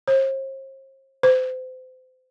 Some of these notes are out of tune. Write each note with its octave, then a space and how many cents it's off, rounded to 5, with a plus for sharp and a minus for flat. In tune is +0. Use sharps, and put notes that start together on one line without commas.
C5 +45
C5 -30